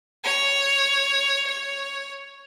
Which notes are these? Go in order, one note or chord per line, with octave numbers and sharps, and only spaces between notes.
C#5
C#5